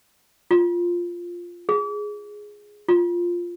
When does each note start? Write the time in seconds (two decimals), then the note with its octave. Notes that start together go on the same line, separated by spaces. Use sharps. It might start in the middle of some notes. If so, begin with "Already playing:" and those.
0.51 F4
1.69 G#4
2.88 F4